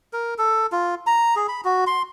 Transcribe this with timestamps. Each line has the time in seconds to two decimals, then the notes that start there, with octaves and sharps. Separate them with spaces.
0.13 A#4
0.38 A4
0.72 F4
1.07 A#5
1.36 G#4
1.48 B5
1.65 F#4
1.87 C6